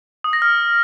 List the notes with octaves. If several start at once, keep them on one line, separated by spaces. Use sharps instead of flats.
D#6
A#6
F6